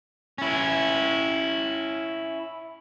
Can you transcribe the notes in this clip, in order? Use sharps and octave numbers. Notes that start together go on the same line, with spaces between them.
C#4 E4